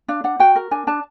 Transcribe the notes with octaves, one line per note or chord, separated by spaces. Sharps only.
D4 F5
D4 F#5
F#4 G5
A#4
D4 G#5
D4 A5